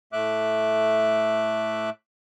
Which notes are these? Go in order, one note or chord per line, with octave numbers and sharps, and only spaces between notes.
A2 A3 E5 D6 F#6